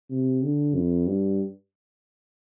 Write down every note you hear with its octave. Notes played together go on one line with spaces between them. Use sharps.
C3
D3
F2
G2